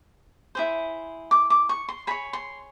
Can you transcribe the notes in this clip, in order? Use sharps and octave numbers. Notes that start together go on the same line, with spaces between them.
E4 G#4 C5
D6
D6
C#6
C6
G#4 C#5 B5
C6